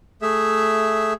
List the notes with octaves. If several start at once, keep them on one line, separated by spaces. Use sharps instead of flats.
A3 G#4 E5